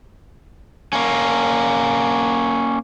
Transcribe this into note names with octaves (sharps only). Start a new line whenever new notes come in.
A#3 C#4